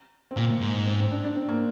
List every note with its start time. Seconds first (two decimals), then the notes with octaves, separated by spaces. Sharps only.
0.31 C4
0.36 A#2 A#3
0.61 G#2
0.86 C4
0.99 C4
1.11 D4
1.24 D4
1.35 C4
1.48 A#3